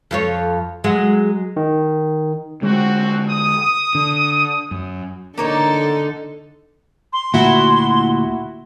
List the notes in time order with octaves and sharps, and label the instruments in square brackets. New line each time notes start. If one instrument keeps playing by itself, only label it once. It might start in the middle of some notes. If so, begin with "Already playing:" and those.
[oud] F2 F4 C#5
F#3 G#3
[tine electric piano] D#3
[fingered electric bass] D3 G#3 [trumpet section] C4 F#4
[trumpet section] D#6
[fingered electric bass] D3
F#2
[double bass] D3 [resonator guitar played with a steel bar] A#3 A#4 C#5 [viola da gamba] D#4 A4
[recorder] C6
[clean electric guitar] D2 A#2 [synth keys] E4 F#4